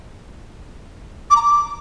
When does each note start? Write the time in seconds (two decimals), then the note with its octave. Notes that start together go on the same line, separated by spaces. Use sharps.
1.30 D6
1.36 A#5
1.42 D6